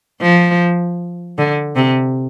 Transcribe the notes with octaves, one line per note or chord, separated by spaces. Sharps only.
F3
D3
C3